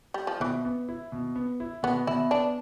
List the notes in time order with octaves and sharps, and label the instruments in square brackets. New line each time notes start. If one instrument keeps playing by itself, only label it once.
[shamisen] G3
F3
[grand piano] B2 [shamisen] E3
[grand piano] B3
E4
B2
B3
E4
[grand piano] B2 [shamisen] B3
[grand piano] B2 [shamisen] E4
[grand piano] B3 [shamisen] D4